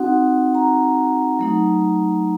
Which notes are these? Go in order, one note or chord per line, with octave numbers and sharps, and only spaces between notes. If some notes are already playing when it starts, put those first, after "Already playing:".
Already playing: C4 D#4 F#4 F#5
A#5
F#3 A3 D#4